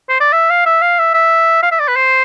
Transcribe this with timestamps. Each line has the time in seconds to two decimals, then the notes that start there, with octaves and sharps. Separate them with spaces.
0.09 C5
0.20 D5
0.33 E5
0.50 F5
0.65 E5
0.82 F5
0.99 E5
1.14 E5
1.63 F5
1.71 E5
1.80 D5
1.88 B4
1.96 C5